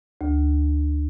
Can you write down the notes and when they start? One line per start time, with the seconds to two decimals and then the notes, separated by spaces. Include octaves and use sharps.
0.21 D2